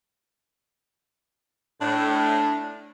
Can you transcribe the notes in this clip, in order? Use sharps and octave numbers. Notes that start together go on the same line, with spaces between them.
A2 D4